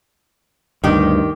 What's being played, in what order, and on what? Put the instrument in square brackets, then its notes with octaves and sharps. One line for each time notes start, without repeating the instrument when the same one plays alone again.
[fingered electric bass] D2 G2 [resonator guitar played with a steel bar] D#3 G4